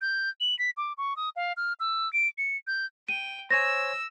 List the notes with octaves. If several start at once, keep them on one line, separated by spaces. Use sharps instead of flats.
G6
F#7
B6
D6
C#6
D#6
F5
F6
E6
D7
C#7
G6
G5 D#7
C5 C#5 G#5 E6 A#6